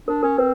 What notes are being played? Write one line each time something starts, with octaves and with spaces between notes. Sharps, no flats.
D4 A#4
C#4 A#4
C4 B4